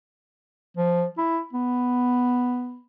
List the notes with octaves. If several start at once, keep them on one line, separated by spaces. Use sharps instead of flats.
F3
E4
B3